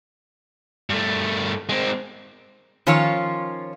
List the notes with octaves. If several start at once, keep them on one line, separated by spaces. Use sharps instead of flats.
G2 A3
G#3 C4
D#3 F3 C#4 F4 C#5